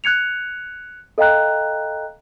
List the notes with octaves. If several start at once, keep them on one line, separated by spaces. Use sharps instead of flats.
F#6 G#6 C#7 F7
A4 D#5 F5 G5 A#5 F#6